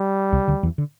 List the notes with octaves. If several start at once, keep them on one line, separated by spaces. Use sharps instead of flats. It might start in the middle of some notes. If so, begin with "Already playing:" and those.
Already playing: G3
C2 C3
D2 D3
E2 E3
D3